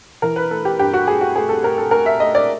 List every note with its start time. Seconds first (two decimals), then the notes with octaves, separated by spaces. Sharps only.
0.22 E3 A#4
0.36 B4
0.51 A3 A4
0.65 G4
0.79 G2 G4
0.94 F#4
1.07 A3 G#4
1.21 F#4
1.36 A3 G#4
1.49 A4
1.63 A3 A#4
1.78 A4
1.91 A3 A#4
2.06 E5
2.20 A3 D#5
2.35 D5